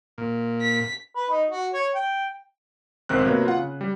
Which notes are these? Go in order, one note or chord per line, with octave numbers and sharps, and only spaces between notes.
A#2
B6
B4
D#4
F#4
C#5
G5
B1 G#2 D#3 C4 F#6
C3 F#3 A#3 B3
F4 F#5
C#3
G3